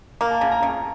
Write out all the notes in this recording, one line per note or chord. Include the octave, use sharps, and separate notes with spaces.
A#3 A#5
A5
C#3 A#5
A#5
C#3 A#5